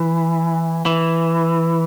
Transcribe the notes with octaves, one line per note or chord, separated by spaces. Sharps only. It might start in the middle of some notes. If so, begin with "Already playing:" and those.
Already playing: E3
E3